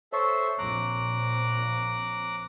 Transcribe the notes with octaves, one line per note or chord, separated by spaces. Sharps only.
A4 C5 C#5 E5 C#6
A#1 A#2 C4 A#5 D6 F#6